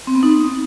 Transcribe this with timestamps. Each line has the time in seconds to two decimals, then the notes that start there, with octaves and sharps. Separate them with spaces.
0.07 C4
0.15 B3
0.23 D#4